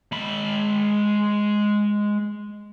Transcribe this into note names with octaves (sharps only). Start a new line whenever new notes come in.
G#3 B5